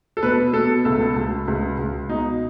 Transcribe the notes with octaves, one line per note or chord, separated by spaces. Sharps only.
A4
B2 B4
B2 A4
C#2 A4
C#2
C#2
C#2
B2 D#4